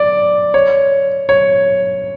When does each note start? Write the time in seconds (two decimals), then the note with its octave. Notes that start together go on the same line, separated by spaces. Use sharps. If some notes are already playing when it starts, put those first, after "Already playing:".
Already playing: D5
0.54 C#5
1.29 C#5